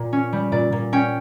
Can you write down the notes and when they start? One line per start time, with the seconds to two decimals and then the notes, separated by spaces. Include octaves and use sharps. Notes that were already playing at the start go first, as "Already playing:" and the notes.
Already playing: A#2
0.13 C#4
0.33 G3
0.52 A#2 D5
0.72 A#2
0.93 C#4 G5